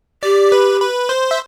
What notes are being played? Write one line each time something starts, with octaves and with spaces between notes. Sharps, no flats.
G4 D5
B4
B4
C5
E5